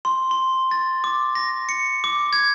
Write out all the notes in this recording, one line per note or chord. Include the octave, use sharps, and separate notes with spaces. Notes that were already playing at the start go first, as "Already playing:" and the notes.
C6
C6
A6
D6
A#6
C#7
D6
G#6